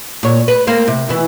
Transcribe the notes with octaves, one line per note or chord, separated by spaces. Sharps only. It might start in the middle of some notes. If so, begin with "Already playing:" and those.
A#2 C#5
B4
A#3 C4
C3
B2 E3